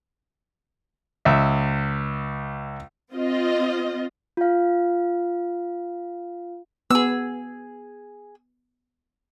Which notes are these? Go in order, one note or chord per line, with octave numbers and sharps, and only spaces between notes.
C#2 E5
C4 F4 D#5
F4 F5
B3 G#4 E6